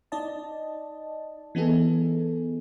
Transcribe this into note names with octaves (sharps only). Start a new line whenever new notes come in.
D#4 D5 D#5 A5
E3 B3 D#4 G#4 A4